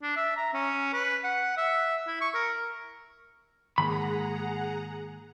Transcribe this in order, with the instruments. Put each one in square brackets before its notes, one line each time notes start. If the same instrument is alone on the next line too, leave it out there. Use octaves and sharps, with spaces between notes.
[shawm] D4
E5
A#5
C#4
B4
F#5
E5
E4
C#6
A#4
[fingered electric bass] G#2 [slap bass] D#3 G#3 A#3 [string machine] G#4 F#5 A#5 [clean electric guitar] B5